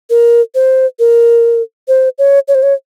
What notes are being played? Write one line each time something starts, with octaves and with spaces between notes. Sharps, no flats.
A#4
C5
A#4
C5
C#5
C#5
C5
C#5